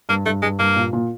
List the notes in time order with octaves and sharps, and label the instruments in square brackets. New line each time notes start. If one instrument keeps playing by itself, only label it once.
[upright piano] G2 [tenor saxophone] A#3
[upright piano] G2 [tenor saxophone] A3
[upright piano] G2 [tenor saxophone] G#3
[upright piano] G2 [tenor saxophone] A#3
[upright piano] A#2
A#2